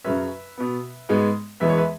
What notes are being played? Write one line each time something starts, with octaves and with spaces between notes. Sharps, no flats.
F#2 C#3 F#3 C#4 B4 E5
B2 B3
G#2 G#3 B3
E2 E3 G#3 B3 E5
C#5
B4 E5